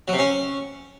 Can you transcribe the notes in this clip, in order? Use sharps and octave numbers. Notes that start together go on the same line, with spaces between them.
F#3
C3
C#4